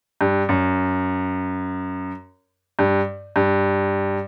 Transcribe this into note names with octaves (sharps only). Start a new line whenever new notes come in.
G2
F#2
G2
G2